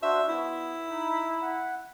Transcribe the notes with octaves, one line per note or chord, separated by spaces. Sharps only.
D4 F#4 C5 E5
B3 E4
D#4 B5
F#5